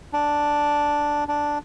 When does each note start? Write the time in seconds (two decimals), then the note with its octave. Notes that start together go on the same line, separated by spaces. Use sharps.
0.13 D4
1.28 D4